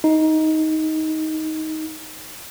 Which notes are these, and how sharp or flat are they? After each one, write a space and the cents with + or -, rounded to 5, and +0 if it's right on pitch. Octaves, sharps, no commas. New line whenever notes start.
D#4 +15